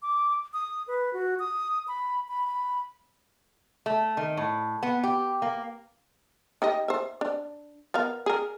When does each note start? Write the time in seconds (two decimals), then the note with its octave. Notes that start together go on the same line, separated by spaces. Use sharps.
0.02 D6
0.53 D#6
0.88 B4
1.13 F#4
1.39 D#6
1.88 B5
2.28 B5
2.47 B5
3.86 A3
4.17 D#3
4.37 A2
4.83 B3
5.04 G4
5.42 A#3
6.62 D#4 G4 D#5
6.88 C5 E5
7.21 D4
7.94 B3 A#4 F5
8.26 G#4 A#4